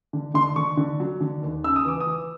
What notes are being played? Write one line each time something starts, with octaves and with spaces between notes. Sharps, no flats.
D3
D3 C6
D3 C#6
D3
F#3
D3
D#2
C#3 E6
D#6
E3 D6
D#6
E3